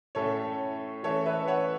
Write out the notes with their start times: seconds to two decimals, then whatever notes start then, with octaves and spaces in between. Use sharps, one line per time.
0.15 A2 A3 C#4 A4 C#5
1.03 E3 A3 C#4 A4 C#5
1.26 B4 E5
1.47 C#5 F#5